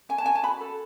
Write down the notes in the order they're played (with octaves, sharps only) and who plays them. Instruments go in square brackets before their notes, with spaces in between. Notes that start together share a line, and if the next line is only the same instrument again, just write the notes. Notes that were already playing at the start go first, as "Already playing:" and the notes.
[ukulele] C#4 G#5
A5
C#4 G#5
A5
F#4 B5
A4